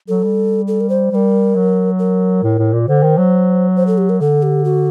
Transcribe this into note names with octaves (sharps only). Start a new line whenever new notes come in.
F#3 A4
G3
A4
A#4
C5
G3 A#4 C5
F#3
A#4
A2
A2
A#2
D3 C5
D#3
F#3
C5
A4
G4
A#4
D3 A4
G4
F#4